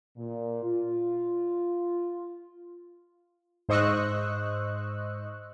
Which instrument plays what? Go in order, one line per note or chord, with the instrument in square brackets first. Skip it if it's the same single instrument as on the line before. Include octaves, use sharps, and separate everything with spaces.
[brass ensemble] A#2
F4
[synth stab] G#2 C5 D#5 C#6 E6 F#6